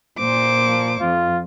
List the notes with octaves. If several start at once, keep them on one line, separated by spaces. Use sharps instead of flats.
A#2 C5 D6
F3
F2 F4